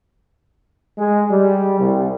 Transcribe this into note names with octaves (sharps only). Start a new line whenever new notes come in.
G#3
G3
C2